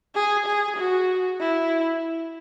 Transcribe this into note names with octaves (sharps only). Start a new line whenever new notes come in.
G#4
G#4
F#4
E4